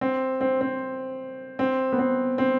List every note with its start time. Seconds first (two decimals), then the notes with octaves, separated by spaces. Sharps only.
0.01 C4
0.41 C4
0.61 C4
1.59 C4
1.92 B3
1.99 C4
2.38 C4